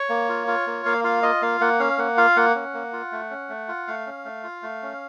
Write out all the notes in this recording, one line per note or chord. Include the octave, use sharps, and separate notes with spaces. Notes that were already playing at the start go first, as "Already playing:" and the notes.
Already playing: C#5
A#3
F4
F4
A#3
A#3 F5
F4 F5
F4 D#5
A#3 F5
A#3 F#5
C#4 F5
A#3 F#5
F4 F5
A#3 F#5
C#4
A#3
F4
A3
C#4
A3
F4
A3 F5
C#4
A3
F4
A3
C#4